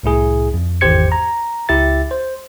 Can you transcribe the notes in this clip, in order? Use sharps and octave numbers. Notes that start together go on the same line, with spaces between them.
C2 A2 E4 G#4
F2
G#1 E2 G4 C5 G#6 C#7
A#5
C#2 E4 G4 E5 A6
C5